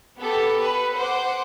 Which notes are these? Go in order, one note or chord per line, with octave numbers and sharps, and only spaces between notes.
B3 G4 A4
B4
C5 F#5 D6